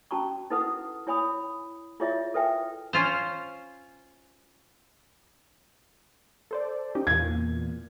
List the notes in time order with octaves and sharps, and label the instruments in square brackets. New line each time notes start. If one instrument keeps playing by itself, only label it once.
[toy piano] C#4 F#4 A5 A#5 C#6
D#4 E4 A4 B4 F#5 D#6
E4 C#5 G#5 B5 D#6
E4 F4 G#4 C#5 D#5 E5
A4 B4 E5 G5 G#5
[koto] C#4 F4 C5
[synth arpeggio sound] A4 C5 D5
C#4 D#4 G4
[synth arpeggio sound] E2 A#2 [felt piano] G#6